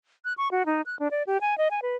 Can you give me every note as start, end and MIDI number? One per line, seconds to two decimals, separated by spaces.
0.25 0.33 90
0.38 0.48 85
0.51 0.66 66
0.66 0.82 63
0.86 0.98 90
0.99 1.08 62
1.11 1.23 74
1.27 1.38 67
1.41 1.57 80
1.58 1.68 75
1.71 1.80 80
1.82 1.96 71